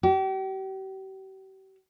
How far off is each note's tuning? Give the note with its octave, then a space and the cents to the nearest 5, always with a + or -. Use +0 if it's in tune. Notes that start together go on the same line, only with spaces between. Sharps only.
G4 -40